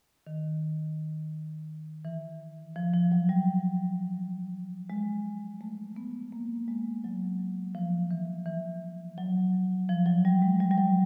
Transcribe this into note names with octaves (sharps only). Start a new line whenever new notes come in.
D#3
E3
F3
F3
F#3
G3
G#3
A3
B3
A#3
G#3
F#3
F3
E3
E3
F#3
F3
F#3
G3
G#3
G3
G3
F#3